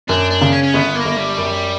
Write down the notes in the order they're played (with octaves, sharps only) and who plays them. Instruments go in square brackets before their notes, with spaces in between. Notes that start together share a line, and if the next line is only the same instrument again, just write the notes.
[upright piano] F#2 [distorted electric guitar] D4
[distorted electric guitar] D4
[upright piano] C#3
[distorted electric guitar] C#4
C#4
[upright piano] G1 [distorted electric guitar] B3
[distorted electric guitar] A#3
[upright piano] G1
[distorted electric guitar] G3
[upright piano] F#2